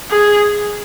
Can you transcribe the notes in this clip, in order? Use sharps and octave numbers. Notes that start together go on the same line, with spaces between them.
G#4